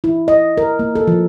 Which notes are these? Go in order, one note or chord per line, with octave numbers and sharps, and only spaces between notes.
E4
D#5
A#4
A#3
A4
F3